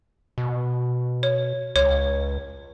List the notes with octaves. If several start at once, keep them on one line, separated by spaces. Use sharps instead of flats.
B2
C#5
C#2 C#5